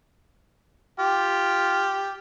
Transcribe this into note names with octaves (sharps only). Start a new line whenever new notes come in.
F4 G4